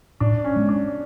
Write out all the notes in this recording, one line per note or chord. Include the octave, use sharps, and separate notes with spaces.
A2 D4
C#4
G#3 B3
D4